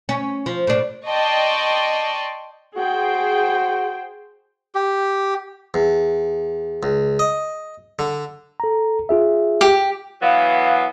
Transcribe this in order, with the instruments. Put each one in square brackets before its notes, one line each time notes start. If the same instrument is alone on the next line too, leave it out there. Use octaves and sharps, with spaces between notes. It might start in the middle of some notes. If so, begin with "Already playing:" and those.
[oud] C#4
F3
A2 D4
[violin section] D5 D#5 G5 A5 C6 C#6
[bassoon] F#4 [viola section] G#4 C5 G5
[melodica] G4
[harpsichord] E2
C#2
D#5
D3
[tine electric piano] A4 A#5
F4 G#4 E5
[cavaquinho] G4
[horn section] E3 F#3 B3 [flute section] F5